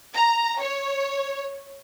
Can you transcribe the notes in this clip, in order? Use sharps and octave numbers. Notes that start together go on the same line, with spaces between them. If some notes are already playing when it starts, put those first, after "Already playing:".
A#5
C#5